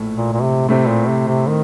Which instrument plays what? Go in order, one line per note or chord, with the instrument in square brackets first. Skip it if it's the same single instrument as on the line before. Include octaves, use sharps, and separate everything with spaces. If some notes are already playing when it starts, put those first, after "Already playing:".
Already playing: [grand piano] A#1 A2 A3
[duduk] A#2
A#2
C3
[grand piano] A2 A3 C4 [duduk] C3
[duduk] A#2
C3
C3
D#3